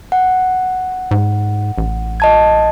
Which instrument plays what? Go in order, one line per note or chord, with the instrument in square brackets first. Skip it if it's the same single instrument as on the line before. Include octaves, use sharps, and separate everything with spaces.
[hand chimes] F#5
[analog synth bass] G#2
A1
[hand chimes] D#5 A5 G#6